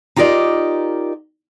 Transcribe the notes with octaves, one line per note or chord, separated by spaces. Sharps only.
D#4 F4 G4 A#4 D5 D#5